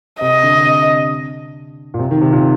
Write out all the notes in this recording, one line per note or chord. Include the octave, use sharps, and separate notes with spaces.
C3 D#5
D3
C3
A#2
C3
D#3
C3
A#2